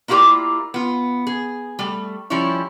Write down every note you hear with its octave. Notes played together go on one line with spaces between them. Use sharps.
A#3 E4 F4 G4 A#4 D5
B3 F4
G#4
G3 A3
F3 G3 C#4 E4 C#5